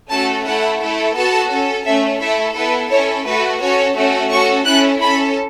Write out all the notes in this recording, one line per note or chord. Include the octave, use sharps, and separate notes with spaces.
A3 C#4 F#4 A4 A5
A3 E4 A4 F#5
A3 E4 A4
B3 F#4 A4 A5
C#4 A4
A3 C#4 A4 E5
A3 E4 A4 E5
B3 E4 A4 B4
C#4 E4 A4 C#5
A3 F#4 A4 B4
C#4 F#4 A4 C#5
A3 C#4 F#4 A4
C#4 F#4 A4 C#6
C#4 E4 A4 F#6
C#4 A4 B5